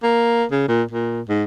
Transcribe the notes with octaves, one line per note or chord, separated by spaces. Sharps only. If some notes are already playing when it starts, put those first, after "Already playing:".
A#3
C#3
A#2
A#2
G#2